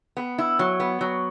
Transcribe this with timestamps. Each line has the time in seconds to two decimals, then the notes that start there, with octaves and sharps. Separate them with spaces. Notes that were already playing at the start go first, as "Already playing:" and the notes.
0.17 B3
0.38 E4
0.59 F#3
0.80 B3
1.01 F#3